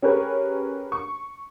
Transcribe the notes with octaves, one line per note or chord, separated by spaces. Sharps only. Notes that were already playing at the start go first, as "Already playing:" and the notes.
C#4 G4 G#4 A#4 B4 C#5
C#6